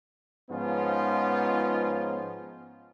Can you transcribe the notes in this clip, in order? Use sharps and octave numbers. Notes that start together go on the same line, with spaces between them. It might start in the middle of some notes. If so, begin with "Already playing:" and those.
G#2 F3 B3 C#4 D#4 F4